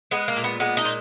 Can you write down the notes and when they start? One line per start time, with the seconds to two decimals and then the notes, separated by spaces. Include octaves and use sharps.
0.11 G#3 B3
0.28 A#3
0.36 A#2
0.44 B3
0.60 G#3 B3
0.77 D#4
0.85 A#2